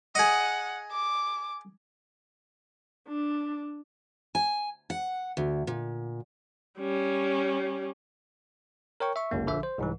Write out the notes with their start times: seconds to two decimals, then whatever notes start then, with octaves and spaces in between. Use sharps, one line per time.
0.15 G#4 D#5 F#5
0.91 D6
3.08 D4
4.35 G#5
4.90 F#5
5.37 D2
5.67 A#2
6.79 G3 C#4
9.00 A#4 C#5 G5 C#6
9.16 E5 C#6
9.31 G1 C#2 F#2 A#3
9.47 A#1 D3 F3 E5
9.63 C5
9.78 C2 G#2 E3